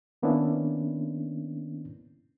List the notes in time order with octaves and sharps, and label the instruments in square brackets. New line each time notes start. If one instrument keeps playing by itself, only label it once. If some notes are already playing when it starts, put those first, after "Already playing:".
[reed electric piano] D#3 A#3 B3 C#4 D4 E4